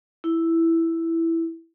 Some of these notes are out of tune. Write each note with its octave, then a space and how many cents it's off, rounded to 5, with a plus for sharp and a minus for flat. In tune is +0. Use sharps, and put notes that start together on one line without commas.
E4 +5